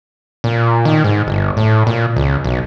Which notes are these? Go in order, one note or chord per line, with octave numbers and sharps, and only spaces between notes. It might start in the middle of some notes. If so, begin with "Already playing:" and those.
A#2
D#3
G#2
G1
A2
A#2
C#2
B1